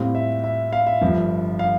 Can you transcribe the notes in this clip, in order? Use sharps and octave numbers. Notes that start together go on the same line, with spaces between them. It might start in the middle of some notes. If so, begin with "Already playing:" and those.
Already playing: A2 G3 C4 F5
E5
E5
F5
E5
G1 G2 F3
F5